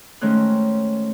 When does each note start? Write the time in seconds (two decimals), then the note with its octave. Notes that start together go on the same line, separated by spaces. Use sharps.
0.21 D#3 G#3 A3 C#4 C5 F#6